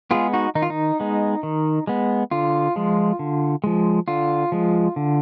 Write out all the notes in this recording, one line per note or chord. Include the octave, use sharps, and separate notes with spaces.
G#3 B3 F4 G#4
D#4 F#4
D#3 D#4
F4
D#4
G#3 B3
D#3
G#3 B3
D3 F4
F3 G#3
D3
F3 G#3
D3 F4
F3 G#3
D3